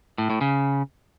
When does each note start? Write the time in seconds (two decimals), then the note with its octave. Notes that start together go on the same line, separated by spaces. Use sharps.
0.18 A2
0.30 A2
0.41 C#3